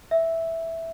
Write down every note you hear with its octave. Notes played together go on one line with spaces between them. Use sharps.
E5